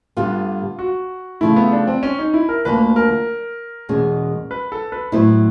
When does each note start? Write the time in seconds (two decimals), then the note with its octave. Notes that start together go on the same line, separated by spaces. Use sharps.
0.17 G2 D3 G3 B3 F4
0.79 F#4
1.41 C#3 F3 A3 E4
1.56 B3
1.72 D4
1.87 C4
2.03 C#4
2.19 D#4
2.34 E4
2.49 A#4
2.65 D2 D3 F3 A#3 B4
2.96 A#4
3.89 E2 B2 G#3 C#4
4.51 B4
4.72 A4
4.92 B4
5.12 A2 F#3 B3 E4 C5